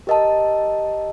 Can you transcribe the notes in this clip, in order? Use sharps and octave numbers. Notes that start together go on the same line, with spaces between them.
G4 A#4 D#5 A5